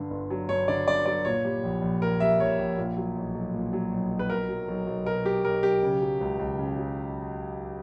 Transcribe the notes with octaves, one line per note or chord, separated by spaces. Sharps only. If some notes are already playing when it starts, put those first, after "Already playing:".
Already playing: G2 D3
G1
F#3
G2 C#5
D3 D5
G1 D5
F#3 D5
A#2 C#5
G3
A#1
A#1
A#2 A#4
G3 E5
A#1 C#5
A#1
A#2
F#3
B1
B1
A#2
F#3
B1
B1
B4
B2 A#4
F#3
B1
B1
B2 A#4
F#3 G4
B1 A#4
B1 G4
C#3
F#3
C#2
C#2
C#3
F#3